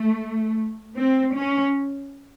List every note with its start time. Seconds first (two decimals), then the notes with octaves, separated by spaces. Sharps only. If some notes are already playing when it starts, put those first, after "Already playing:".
Already playing: A3
0.97 C4
1.36 C#4